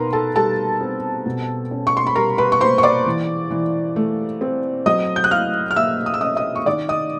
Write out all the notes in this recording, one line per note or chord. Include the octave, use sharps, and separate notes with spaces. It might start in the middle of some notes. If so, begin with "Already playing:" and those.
Already playing: B2 D#4 A#4 B4 A#5 C6
A4 A5
G3 A4 A5
C4
B2
C#4
C#6
C6
B5
G3 A#4 A#5
B4 B5
C#6
A#3 C5 C6
C#6
D5 D6
E3
E3
A3
C4
F#3 D#5 D#6
G6
F#6
E4 F5 F6
F6
A#3 E5 E6
D#6
E6
C#4 D#5 D#6
D#5 D#6
C#6
D#3 D5 D6
D#5 D#6